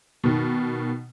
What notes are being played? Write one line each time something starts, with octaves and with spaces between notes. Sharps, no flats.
B2 D#3